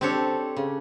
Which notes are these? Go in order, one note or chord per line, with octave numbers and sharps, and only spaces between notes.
C4 D4 G4 A4 C#5
C#3